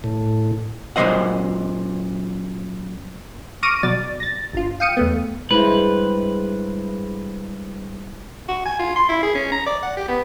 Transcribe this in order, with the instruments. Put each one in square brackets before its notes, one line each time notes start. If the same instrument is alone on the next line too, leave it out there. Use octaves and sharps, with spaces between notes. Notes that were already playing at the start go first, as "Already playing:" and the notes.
[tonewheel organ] A2
[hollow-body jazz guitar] F#2 A#2 F#3 C5 D#5 F#5
[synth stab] C#6 D6 F6 A#6 D7 D#7
B2 F#3 D5 A6
A6 A#6
G1 F4
F5 G5 D#6 C#7 D#7
E2 A3 B3
[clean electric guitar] G2 B4 [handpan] G#3 E4 C5
[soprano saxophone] F#4
G#5
F4
C6
E4
G#4
C#4
A#5
D5
F#5
G4
B3